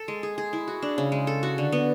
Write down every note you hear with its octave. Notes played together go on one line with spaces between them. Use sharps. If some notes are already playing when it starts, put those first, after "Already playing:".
Already playing: A4
G#3
G#4
G#4
E4
F#4
D4
C#3
G#3
A4
F#4
D3
B3